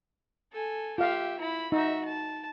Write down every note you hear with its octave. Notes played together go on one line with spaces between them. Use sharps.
A4 G#5
F4 G4 E5 F5
E4 B5
D#4 F#4 E5
A5